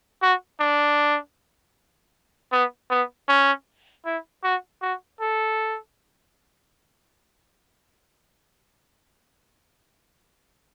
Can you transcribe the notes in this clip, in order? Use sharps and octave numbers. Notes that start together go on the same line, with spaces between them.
F#4
D4
B3
B3
C#4
E4
F#4
F#4
A4